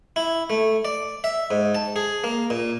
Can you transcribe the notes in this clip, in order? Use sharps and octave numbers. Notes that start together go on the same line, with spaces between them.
E4
A3
D5
E5
G#2
A5
G#4
A#3
A#2